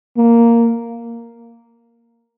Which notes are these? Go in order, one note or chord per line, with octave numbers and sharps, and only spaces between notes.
A#3